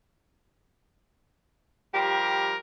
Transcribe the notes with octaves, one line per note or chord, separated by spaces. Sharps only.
F3 G3 G4 A#4